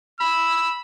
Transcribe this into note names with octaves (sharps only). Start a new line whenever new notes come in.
B5 E6